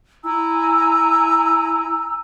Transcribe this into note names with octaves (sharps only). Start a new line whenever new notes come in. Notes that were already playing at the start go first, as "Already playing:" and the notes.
E4 G#5 A#5 E6